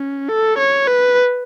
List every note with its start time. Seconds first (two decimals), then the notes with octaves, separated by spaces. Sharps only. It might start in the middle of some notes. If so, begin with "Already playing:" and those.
Already playing: C#4
0.29 A4
0.58 C#5
0.87 B4